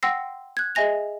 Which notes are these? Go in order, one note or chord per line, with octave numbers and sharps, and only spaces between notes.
F#5 G5 C6 E6 A#6 C7
F#6 G#6
G#4 D#5 E5 G#5 A#6 F7